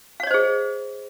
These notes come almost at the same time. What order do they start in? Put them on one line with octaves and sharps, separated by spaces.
F5 C#5 D#5 C5 G#4